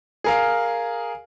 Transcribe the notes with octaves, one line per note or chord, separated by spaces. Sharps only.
G#4 A#4 F5